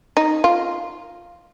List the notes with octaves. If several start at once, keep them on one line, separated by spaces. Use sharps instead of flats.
D#4
F4